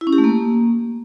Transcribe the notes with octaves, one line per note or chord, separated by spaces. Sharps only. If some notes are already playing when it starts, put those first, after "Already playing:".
E4
C#4
G4
A3
A#3